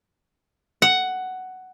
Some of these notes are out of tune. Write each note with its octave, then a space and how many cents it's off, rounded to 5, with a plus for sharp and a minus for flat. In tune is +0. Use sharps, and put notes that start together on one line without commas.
F#5 +10